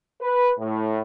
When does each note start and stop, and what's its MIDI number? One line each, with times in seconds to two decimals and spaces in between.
0.22 0.51 71
0.59 1.00 45